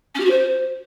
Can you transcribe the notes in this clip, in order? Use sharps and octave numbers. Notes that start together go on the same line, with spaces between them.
C#4
G4
F#4
C5